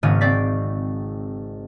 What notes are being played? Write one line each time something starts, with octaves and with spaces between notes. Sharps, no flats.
G#1 G#2 C#3 A#3 C#4 D#7
C4 D5 C#6 B6